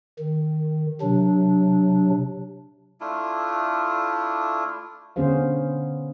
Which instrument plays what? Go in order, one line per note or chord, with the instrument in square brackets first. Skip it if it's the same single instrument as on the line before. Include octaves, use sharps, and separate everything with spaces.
[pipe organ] D#3
C3 F#3 D4
[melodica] A3 D4 E4 F4
[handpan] D3 B3 C#4 G#4 C5 F5